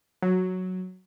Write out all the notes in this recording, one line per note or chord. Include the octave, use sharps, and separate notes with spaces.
F#3